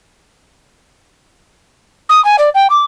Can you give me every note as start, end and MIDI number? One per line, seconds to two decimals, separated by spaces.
2.09 2.23 87
2.25 2.36 80
2.38 2.50 74
2.55 2.67 79
2.70 2.85 86